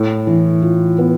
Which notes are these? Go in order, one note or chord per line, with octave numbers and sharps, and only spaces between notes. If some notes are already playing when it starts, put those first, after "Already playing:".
Already playing: A2
E3
F4
B3